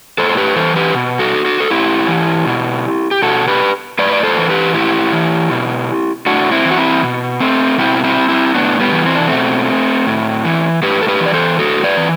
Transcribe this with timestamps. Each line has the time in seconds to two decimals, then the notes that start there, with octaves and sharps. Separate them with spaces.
0.18 A2 A4 C5
0.29 C5
0.37 G4 B4
0.56 E3 A4 C5
0.76 G4 B4
0.95 B2
1.19 F#4 A4
1.45 F#4 A4
1.60 A4
1.70 A2 E4 G4
2.08 E3
2.46 B2
3.11 G4
3.22 B2 F#4 A4
3.47 G4 B4
3.99 A2 B4 D5
4.13 D5
4.23 A4 C5
4.37 E3
4.49 G4 B4
4.74 A2 E4 G4
5.12 E3
5.51 B2
6.26 A2 D4 F#4
6.52 C4 E4
6.64 E3
6.71 F#4
6.77 C4 E4
7.03 B2
7.40 A3 C4
7.78 B2 C4 E4
8.04 C4 E4
8.29 C4 E4
8.54 A2 B3 D4
8.80 G3 B3
8.92 E3
9.06 C4
9.16 D4
9.27 B2 A3 C4
10.07 A2
10.45 E3
10.82 A2 G4 B4
11.02 A4
11.08 G4 B4
11.20 E3
11.26 D5
11.34 A4 C5
11.59 A2 F#4 A4
11.84 B4 D5
11.97 E3